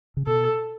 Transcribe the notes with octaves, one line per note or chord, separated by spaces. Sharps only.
C#3
B2 A4